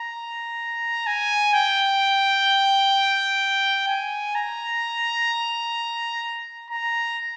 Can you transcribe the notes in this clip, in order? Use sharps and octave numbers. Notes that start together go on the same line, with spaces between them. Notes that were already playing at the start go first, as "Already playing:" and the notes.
Already playing: A#5
G#5
G5
G#5
A#5
A#5